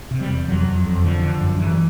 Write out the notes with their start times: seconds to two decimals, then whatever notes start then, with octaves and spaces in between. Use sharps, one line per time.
0.11 C3
0.21 G3
0.30 E2
0.48 F2 F#3
0.67 F2
0.85 F2
1.04 D3 F3
1.22 D3
1.41 F#2
1.59 G#2 E3